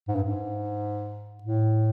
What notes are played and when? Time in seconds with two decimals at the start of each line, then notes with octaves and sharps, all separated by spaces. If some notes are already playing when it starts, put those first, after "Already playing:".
0.08 G#2
0.15 G2
0.23 G#2
1.43 A2